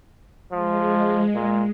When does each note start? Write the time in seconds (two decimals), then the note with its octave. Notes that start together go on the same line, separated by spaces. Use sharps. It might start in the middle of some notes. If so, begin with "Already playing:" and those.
0.52 F3 G#3
1.35 A#2